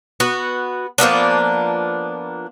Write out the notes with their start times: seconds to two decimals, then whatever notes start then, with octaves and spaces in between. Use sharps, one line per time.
0.20 B3 F#4
0.98 F3 A#3 B3 D4